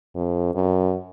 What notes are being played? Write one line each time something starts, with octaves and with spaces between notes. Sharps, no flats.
F2
F#2